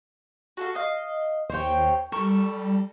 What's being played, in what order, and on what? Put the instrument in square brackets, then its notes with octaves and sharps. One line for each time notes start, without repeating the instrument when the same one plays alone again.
[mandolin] F#4 A4 F5
D#5 F5
[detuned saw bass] D#2 [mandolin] C5 C#5 G5
[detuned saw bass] G3 [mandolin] A4 A#4 C#6